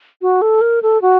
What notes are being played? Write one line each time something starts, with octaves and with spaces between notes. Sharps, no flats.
F#4
A4
A#4
A4
F#4